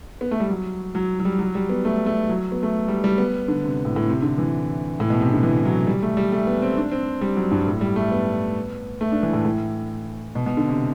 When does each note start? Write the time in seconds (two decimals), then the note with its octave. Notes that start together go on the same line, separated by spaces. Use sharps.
0.21 B3
0.31 A3
0.40 G3
0.50 F#3
0.95 F#3
1.20 F#3
1.25 G3
1.39 F#3
1.55 G3
1.70 B3
1.85 A3
2.06 A3
2.29 F#3
2.52 B3
2.63 A3
2.88 G3
3.04 G3
3.18 B3
3.48 D3
3.64 C3
3.85 A2
3.96 A2
4.08 C3
4.22 D3
4.38 E3
5.00 A2
5.10 B2
5.21 C3
5.32 D3
5.43 E3
5.65 F#3
5.87 G3
6.03 A3
6.17 G3
6.32 A3
6.47 B3
6.62 C4
6.77 D4
6.91 C4
7.21 G3
7.36 F#3
7.52 G2
7.67 A2
7.81 G3
7.96 A3
8.12 B3
9.01 A3
9.12 D4
9.23 E3
9.33 A2
9.45 A2
10.35 B2
10.46 B2
10.57 D3
10.68 C3